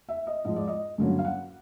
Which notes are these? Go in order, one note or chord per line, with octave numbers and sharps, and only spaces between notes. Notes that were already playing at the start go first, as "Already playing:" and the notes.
E5
D#5
G#2 F3 G#3 D#5
D5
D#5
G2 D3 F#3 A#3 C#4
F5
F#5